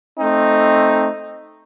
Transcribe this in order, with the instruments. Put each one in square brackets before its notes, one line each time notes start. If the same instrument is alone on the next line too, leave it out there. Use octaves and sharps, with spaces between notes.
[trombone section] A3 C4 D#4